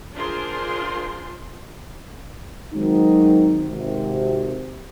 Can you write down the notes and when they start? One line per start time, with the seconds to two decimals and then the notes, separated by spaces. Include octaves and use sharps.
0.15 D4 F4 G#4 A#4 C5 C6
2.74 D#3 F#3 G#3 C4 D#4 F#4
3.67 G#1 C3